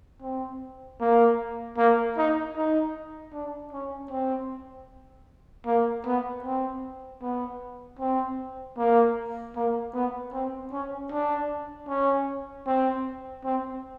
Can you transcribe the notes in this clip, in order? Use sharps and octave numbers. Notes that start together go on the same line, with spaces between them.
C4
A#3
A#3
D#4
D#4
D4
C#4
C4
A#3
B3
C4
B3
C4
A#3
A#3
B3
C4
C#4
D4
C#4
C4
C4